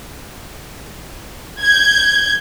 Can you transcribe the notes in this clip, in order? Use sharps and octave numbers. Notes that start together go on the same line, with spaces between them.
G6 G#6